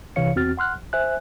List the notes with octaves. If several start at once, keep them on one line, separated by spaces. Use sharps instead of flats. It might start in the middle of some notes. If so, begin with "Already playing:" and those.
C2 C3 E3 C#5 F5 C#7
E2 C4 F#4 F6 A6
F#5 C6 F6 F#6
A#1
C5 E5 G#5 F#6